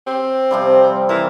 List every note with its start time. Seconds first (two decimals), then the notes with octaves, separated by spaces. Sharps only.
0.07 C4
0.51 C3 F3 G3
1.09 E3 A#4